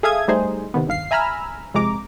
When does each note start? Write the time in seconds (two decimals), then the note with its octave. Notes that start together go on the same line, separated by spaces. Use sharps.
0.03 G#4 A4 E5 F5 D#6 G#6
0.28 G3 A3 D#4 G#4 C5
0.74 C3 D#3 B3
0.87 G1 D#2 F5 C7
1.11 E5 G#5 A#5 B5 E6 F6
1.74 F2 C3 G#3 A#5 D6